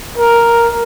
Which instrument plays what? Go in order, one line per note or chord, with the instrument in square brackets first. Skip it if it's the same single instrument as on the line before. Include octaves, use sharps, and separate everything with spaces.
[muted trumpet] A#4